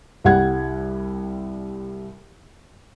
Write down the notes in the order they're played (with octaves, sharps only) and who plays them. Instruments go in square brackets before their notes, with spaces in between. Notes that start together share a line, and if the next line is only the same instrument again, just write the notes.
[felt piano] C2 G3 F#5 G#6